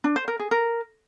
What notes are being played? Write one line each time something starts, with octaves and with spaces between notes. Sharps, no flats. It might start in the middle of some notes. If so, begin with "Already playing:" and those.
D4
C5
A#4
G#4
A#4